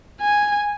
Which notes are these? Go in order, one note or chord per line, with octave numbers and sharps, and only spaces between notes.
G#5